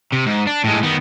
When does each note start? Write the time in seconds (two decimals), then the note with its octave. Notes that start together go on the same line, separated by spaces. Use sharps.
0.12 C3
0.26 G#2
0.47 D4
0.64 A2 G#3
0.83 D#3 B3